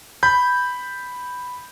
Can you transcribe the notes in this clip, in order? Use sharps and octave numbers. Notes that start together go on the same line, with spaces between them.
B5 G6